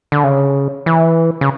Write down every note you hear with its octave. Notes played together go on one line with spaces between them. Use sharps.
D3
C#3
E3
C#3